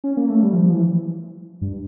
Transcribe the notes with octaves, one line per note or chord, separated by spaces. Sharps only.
C#4
A#3
A3
G3
F3
F3
E3
G2